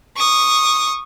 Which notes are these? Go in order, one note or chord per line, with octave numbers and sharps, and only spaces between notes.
C#6 D#6